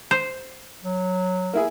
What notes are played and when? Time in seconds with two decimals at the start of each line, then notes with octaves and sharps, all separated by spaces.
0.11 C5
0.83 F#3
1.53 A#3 E4 G#4